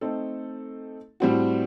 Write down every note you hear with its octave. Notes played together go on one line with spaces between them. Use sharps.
A3 C4 D#4 A4
A2 G3 C4 F#4